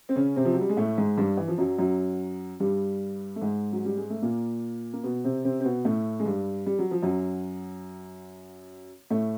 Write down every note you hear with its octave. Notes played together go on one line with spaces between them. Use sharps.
C4
C#3 C#4
C3 C4
F3
F#3
G3
G#3
A2 A3
G#2 G#3
G2 G3
E3
F3
F#2 F#3
F#2 F#3
G2 G3
A3
G#2 G#3
F#3
G3
G#3
A3
A#2 A#3
A#3
B2 B3
C3 C4
C3 C4
C4
B2 B3
A2 A3
G#3
G2 G3
G3
F#3
F3
F#2 F#3
A2 A3